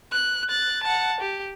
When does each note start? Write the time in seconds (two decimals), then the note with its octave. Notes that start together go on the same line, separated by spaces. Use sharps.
0.12 F#6
0.50 F#6 A6
0.83 F#5 A5
1.20 G4